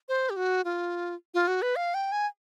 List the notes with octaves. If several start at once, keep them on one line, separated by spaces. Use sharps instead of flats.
C5
G4
F#4
F4
F4
F#4
B4
F5
G5
G#5